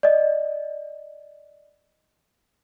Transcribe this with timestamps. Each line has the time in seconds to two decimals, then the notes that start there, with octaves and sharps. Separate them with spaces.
0.03 D5 D#5